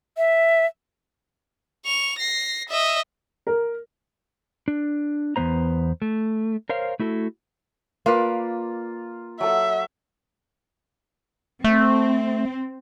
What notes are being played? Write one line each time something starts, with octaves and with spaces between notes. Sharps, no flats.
E5
C#6 F7
A#6 C7
D#5 E5
A#4
D4
E2 F3 B3 C5 A#5
A3
A#4 C5 C#5 F5
A3 E4 F#4 A4
A#3 F4 B4 D5
F#3 A4 E5 F#5
A3 C4